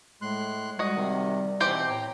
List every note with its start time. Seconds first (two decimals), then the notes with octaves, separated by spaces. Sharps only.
0.22 A2 G#3 C6 F#6
0.79 G3 F#4 D#5
0.95 C3 D#3
1.60 B2 E3 C4 G4 C5
1.90 A2 G5 A#5